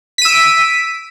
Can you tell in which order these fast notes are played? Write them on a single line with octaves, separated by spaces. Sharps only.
B6 D#7 E6 D7